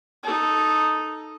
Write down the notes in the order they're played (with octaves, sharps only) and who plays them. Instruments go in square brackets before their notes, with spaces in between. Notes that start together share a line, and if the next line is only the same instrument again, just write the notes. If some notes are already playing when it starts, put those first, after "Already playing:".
[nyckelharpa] D#4 A4